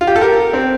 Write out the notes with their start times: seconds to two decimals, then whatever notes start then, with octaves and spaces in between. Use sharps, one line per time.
0.01 F4
0.07 G4
0.16 A4
0.21 G4 A#4
0.53 C4